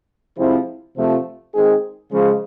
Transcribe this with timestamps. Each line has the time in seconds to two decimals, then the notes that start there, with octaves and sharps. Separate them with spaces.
0.38 C3 F3 G#3 C4 E4
0.96 C3 F3 A3
1.55 D#3 G#3 C4 D#4 G#4
2.13 C#3 F3 G#3